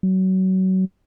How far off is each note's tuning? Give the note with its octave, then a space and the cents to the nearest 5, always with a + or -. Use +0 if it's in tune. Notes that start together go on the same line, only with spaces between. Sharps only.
F#3 +25